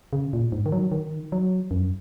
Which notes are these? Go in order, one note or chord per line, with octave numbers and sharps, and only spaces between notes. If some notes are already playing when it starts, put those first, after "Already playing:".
C#3
A#2
G#2
D#3
F#3
D#3
F#3
F#2